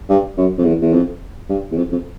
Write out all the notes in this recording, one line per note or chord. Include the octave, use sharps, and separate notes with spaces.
G2
F#2
F2
E2
E2
F2
G2
E2
F2
F2